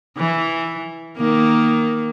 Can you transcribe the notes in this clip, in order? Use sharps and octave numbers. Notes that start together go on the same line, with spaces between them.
E3
D#3 A#3